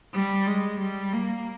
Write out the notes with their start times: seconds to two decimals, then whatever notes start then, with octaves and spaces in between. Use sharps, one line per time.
0.14 G3
0.47 G#3
0.80 G3
1.13 A#3